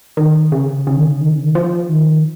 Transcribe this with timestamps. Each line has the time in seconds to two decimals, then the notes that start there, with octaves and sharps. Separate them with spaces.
0.17 D#3
0.52 C#3
0.87 C#3
0.96 D#3
1.05 C#3
1.21 D#3
1.31 C#3
1.42 D#3
1.55 F3
1.89 D#3